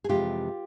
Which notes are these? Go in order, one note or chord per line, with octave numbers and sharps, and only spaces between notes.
G#4
F2 C3 E3 G#3 F4 G4